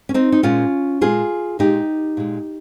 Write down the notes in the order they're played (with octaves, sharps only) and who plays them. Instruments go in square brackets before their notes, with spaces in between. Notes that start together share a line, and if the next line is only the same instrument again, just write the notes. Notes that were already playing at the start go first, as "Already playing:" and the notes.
[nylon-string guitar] C#4
C4 D#4
D#4
A#2 G#3 C#4 F4
A#2 G#3 F4 G#4
A#2 G#3 D#4 G4
A#2 G#3